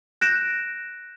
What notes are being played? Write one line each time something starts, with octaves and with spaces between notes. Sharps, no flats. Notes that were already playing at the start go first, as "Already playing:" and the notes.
F#6 G6 A#6 D7 E7